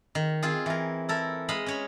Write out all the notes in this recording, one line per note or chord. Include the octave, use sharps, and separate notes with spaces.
D#3
C4 F4 G#4
E3 A#4
E4 A4 A#4
G#3 D#5 F5 B5
C#4 C#5 B5